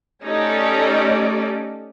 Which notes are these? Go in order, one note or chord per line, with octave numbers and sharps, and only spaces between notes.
A3 C#4 D#4 G4 A4 D5